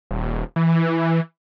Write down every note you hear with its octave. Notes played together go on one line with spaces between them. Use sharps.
D#1
E3